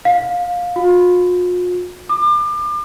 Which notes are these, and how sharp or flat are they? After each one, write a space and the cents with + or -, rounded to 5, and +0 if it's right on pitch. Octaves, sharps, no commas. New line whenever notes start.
F5 +20
F4 +45
D6 +35